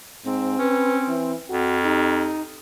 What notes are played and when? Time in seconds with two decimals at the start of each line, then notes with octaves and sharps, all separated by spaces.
0.25 G#2 C4
0.59 C#4 B4
1.08 E3
1.49 F2 F#4
1.84 D#4 G4